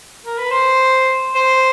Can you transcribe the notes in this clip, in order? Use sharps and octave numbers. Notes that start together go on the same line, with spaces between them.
A#4
B4
C5
C5